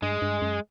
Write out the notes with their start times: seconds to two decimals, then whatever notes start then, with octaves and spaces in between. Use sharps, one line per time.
0.02 G2 G#3
0.22 G2
0.42 F#2